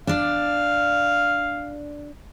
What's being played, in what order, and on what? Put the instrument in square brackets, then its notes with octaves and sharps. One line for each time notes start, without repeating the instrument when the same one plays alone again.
[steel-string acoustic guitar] D4 D5 [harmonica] F5